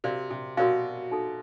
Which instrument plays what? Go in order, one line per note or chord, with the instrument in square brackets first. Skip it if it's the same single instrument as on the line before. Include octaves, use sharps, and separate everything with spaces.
[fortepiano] C3 [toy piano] F#4 A#4 D5 F5
[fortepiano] C3
[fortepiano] B2 [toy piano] F#4 A#4 D5 F5
[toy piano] D#4 F#4 A4